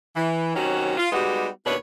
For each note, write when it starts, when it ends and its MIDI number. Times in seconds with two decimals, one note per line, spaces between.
0.15 0.55 52
0.55 0.97 48
0.55 0.97 51
0.55 0.97 54
0.55 0.97 61
0.55 0.97 66
0.97 1.08 65
1.12 1.48 55
1.12 1.48 56
1.12 1.48 59
1.12 1.48 63
1.12 1.48 66
1.12 1.48 67
1.66 1.75 39
1.66 1.75 47
1.66 1.75 62
1.66 1.75 64
1.66 1.75 71
1.66 1.75 73